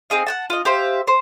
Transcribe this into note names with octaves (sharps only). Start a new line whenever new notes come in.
C4 D#4 G#4 F5
F#5 G5 A5
F4 D#5
G4 C5 E5 F5
C5